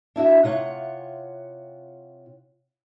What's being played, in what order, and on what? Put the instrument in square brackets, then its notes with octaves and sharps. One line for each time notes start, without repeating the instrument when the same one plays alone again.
[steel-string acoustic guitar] D4 E4 F#4 E5
C3 F4 C#5 F#5